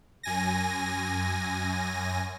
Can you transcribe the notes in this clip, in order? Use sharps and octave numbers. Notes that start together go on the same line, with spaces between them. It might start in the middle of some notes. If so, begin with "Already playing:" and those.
F#2 G#5 A#6